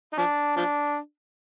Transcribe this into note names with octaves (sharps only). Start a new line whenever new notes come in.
D#4
F3 D4
F3 D4